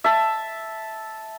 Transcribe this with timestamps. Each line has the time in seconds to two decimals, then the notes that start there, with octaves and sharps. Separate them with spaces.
0.04 E5 A5